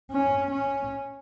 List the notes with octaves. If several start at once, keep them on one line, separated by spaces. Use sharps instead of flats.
C#4
C#4